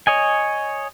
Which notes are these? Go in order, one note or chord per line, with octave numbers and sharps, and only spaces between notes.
C#5 D#5 G#5